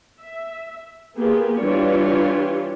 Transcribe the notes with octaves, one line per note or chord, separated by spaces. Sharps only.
E5
A#3 B3 F4 G4 G#4
E3 G3 D4 F4 G4 C#5